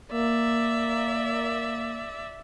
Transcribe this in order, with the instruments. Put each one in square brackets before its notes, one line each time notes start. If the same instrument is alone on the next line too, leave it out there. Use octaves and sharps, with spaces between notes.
[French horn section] A#3 [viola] D5 E5